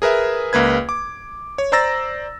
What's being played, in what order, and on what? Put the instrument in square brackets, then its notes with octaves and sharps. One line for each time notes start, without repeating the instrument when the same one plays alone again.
[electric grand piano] G#4 A#4 B4 E5
C#2 A#3 B4 G#6
D6
C#5
C5 D5 A#5 E6 A6 A#6